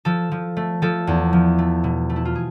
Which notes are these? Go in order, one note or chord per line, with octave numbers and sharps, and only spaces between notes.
F3 A4
F3
A3
F3 A4
E2
F3
A3
B2
A3
E4
F4
G#4